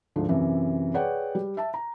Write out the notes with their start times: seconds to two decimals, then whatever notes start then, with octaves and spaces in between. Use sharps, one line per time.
0.16 D2 G#2 D3 F3
0.29 F#2 C3 E3
0.94 G#4 B4 C#5 D5 F#5 G5
1.35 G3
1.57 E5 A5
1.74 A#5